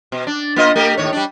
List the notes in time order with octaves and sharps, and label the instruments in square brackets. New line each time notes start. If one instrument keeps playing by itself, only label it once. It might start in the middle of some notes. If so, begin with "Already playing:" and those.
[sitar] B2
D4
A#3 F4 D#5
A3 G4 A#4
D#2 A2 C#5
G3 D4